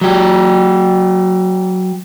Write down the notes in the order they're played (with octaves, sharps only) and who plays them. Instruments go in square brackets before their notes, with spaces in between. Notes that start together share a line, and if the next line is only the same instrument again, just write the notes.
[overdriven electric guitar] F#3 G4